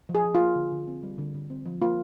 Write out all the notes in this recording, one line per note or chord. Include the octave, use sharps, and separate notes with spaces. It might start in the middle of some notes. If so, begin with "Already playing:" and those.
F3
G#4
F3
F4
A#3
D3
D3
C4
G3
D3
D3
C4
F3
A#3 F4